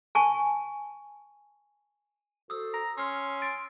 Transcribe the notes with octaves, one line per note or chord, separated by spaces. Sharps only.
G#5 A5 C#6
F#4 A4 C5 D#6 E6
A#5
C#4 C6 E6 F6
A6 D7